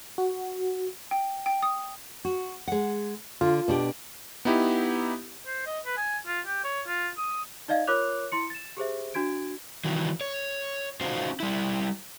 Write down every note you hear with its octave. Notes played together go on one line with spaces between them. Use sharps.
F#4
G5
G5
D#6
F#4
G#3 F#5
D3 F4
B2 D4 G4
B3 D#4 E4 G4
C5
D#5
B4
G#5
F4
G4
C#5
F4
D#6
D#4 D5 D#5 F5 G#6
F4 A#4 C#5 D6 F#6 F7
E4 C6 C#7
A6 E7
G4 G#4 C5 E5
D4 F#4 G#6 D7
D#3 E3 F#3
C#5
C#4 D#4 F4 F#4 C5
G3 E4